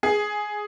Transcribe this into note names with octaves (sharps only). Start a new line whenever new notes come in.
G#4